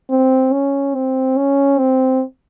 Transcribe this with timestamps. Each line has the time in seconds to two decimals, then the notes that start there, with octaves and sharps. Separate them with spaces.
0.10 C4
0.53 C#4
0.95 C4
1.37 C#4
1.79 C4